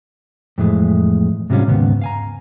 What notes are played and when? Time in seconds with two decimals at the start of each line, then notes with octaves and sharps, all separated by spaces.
0.58 F2 A2 E3 G#3
1.50 G#2 C3 F#3 G3 C#4 F4
1.68 D#2 G#2 C#3 B3
2.01 F5 G#5 A#5